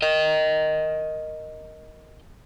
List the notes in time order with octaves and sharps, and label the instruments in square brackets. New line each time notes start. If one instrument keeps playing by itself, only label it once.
[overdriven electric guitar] A#4 D#5